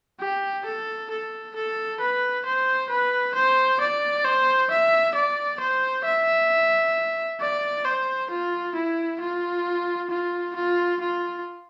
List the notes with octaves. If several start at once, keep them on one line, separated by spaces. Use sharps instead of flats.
G4
A4
A4
A4
B4
C5
B4
C5
D5
C5
E5
D5
C5
E5
D5
C5
F4
E4
F4
F4
F4
F4